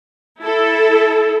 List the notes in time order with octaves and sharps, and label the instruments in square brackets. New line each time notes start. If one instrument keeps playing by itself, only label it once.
[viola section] E4 A4